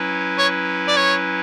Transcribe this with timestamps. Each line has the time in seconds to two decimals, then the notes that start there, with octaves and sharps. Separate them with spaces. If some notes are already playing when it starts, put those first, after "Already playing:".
Already playing: F#3 C#4 E4 B4
0.38 C#5
0.88 D5
0.97 C#5